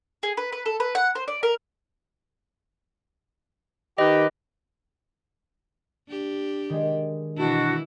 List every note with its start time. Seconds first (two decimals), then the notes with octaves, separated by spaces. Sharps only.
0.23 G#4
0.37 B4
0.52 B4
0.66 A4
0.80 B4
0.95 F#5
1.15 C5
1.28 D5
1.43 A#4
3.98 D#3 G4 B4 D#5
6.08 D4 G4
6.70 D#3 G#3
7.37 B2 E3 D4 E4 F#4